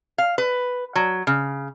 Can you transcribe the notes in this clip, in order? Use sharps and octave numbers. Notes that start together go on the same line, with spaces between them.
F5
B4
F#3
C#3